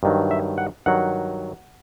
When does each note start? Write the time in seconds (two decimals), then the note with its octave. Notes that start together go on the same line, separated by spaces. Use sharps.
0.03 G2 D#3 F#3
0.31 E5
0.58 F#5
0.86 G2 D#3 F#3 F#5